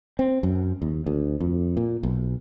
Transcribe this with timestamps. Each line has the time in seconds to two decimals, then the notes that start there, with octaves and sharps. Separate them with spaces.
0.19 C4
0.43 F#2
0.82 D#2
1.06 D2
1.40 F2
1.77 A#2
2.03 B1